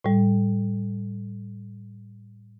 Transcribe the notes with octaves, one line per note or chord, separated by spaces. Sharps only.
A2 G3